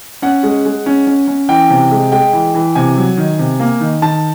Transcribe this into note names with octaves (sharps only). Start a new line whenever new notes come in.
C#4 F#5
G#3
G#3
C#4
C#4
C#4
E3 G5
C3
G#3
G#3 G5
E3
E3
C3 G#5
F#3
D#3
C3
A#3
D#3
D#3 A5